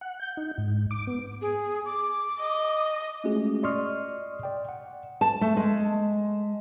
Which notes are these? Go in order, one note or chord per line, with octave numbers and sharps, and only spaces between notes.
F#5
G6
D#4
G#2
D6
B3
G#4
D6
D#5
G#3 A3 C#4 F4 F#4 G#4
D5 D#5 C6 C#6 D#6 F6
D5 G5
F#5
A5
A3
G#3